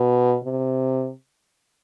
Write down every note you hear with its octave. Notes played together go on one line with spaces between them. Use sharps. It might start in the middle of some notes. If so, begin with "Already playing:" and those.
Already playing: B2
C3